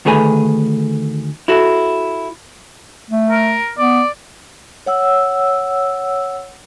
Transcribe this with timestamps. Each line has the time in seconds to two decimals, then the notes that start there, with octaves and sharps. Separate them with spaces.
0.05 D2 D#3 A3 G#4 B4 G#5
1.48 E4 F#4 A4
3.11 A3
3.31 A#4
3.78 B3 D5
4.86 C#5 F#5 E6